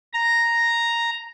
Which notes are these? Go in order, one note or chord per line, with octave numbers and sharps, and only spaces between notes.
A#5